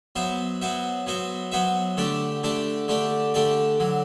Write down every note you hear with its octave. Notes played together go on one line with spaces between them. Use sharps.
F#3 B3 F#4 C5 E5
F#3 B3 F#4 C5 E5
F#3 B3 F#4 C5 E5
F#3 B3 F#4 C5 E5
D3 A3 D4 G4 D5
D3 A3 D4 G4 D5
D3 A3 D4 G4 D5
D3 A3 D4 G4 D5
D3 F#3